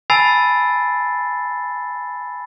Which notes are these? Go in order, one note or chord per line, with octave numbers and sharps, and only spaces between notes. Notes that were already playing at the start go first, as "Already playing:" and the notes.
G#5 A5 B5 E6 A6 C7